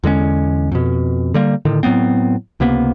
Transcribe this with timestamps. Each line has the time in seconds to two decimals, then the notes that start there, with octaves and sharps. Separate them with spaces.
0.04 E2 D3 G#3 C#4
0.72 F2 B2
1.34 D3 G3 A#3
1.65 A2 D3 D#3
1.83 A2 F#3 B3 C4
2.60 C#2 C3 A#3 B3